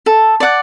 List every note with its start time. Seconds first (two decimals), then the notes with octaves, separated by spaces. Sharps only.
0.06 A4
0.40 D5 F#5